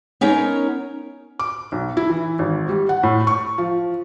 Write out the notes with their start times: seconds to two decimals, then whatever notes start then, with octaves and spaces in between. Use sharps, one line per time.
0.21 B3 C#4 D#4 A#4 C#5
1.39 D6
1.72 B1
1.97 E4
2.09 E3
2.39 G#1
2.69 G3
2.89 F#5
3.03 A2
3.27 C#6
3.58 F3